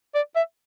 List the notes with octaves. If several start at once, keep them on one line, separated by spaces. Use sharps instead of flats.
D5
E5